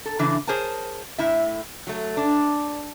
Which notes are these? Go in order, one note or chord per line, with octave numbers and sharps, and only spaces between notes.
A4
C#3 E3 D4
G#4 A#4 C5 C#5 G#5 A5
A2 E4 E5
F#3 A3
D4